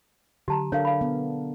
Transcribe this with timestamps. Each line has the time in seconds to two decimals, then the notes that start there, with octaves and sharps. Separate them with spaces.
0.48 D3 F#3 G4 A5 A#5
0.72 D4 A4 A#4 C#5 F5
0.85 F5 B5
1.01 B3